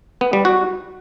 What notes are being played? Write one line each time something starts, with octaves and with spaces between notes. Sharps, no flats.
B3
G3
F#4